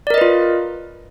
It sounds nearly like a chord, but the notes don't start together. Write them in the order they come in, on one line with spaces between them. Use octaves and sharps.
D5 A#4 D#5 B4 F4